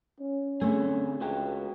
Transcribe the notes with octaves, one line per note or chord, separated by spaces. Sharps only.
C#4
D3 A3 C4 G#4
C#2 F#4 B4 G5